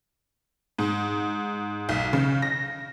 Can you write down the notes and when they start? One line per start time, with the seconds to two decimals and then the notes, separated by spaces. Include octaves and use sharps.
0.79 G#2
1.89 B1
2.13 C#3
2.42 A#6